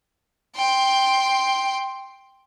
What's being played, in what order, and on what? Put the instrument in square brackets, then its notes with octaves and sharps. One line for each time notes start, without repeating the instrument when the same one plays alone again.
[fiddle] G5 C6